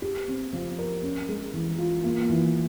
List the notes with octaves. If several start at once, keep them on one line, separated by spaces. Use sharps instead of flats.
G4
C4
F3
A#4
C#4
G#3
E3
F4
A#3
E3